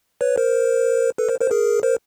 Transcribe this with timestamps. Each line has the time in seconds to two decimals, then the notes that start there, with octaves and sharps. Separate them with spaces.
0.21 B4 C#5
0.38 A#4 C5
1.18 A4 B4
1.29 A#4 C5
1.40 A#4 C5
1.51 G#4 A#4
1.83 A#4 C5